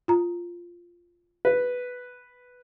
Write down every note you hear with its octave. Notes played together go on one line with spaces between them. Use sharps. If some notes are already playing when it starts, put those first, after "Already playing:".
F4 A#5
B4